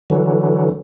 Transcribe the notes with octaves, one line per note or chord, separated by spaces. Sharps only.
D3 E3 F#3